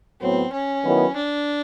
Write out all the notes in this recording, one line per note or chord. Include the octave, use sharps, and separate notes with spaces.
A2 F#3 B3 C4
C#4
D#3 F#3 B3 E4
D4